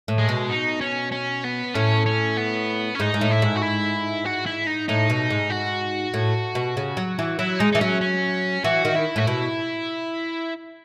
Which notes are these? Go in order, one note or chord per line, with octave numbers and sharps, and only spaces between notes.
A2
G#3
B2
D#4
C#4
C#4
B3
A2 C#4
C#4
B3
C#4
G#2 D#4
G#2
A2
E4
G#2
F#4
E4
F#4
E4
D#4
A2 D#4
B2
G#2
F#4
A2
B2
C#3
F#3
E3
F#3 E4
G#3 D#4
E3 D#4
F#3 C#4
C#4
E3 F#4
D#3
E4
A2 F#4
B2 E4